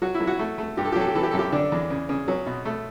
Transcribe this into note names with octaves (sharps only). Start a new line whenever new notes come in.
F#3 F#4
E4
F#3
F#4
A3
A3
G2 G4
A4
G4
F#3 A4
G4
E3 A4
G4
F#2 A4
G4
D3 D4
E2
C#3
C#3
F#3 C#4
B2
A3